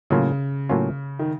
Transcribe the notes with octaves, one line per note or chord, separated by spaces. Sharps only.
A2 C#3 F#3 A#3 C#4 F4
A2 F#3 A#3 C#4 F4
D#3